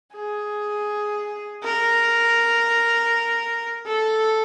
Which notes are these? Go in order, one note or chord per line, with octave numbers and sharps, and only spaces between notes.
G#4
A#4
A4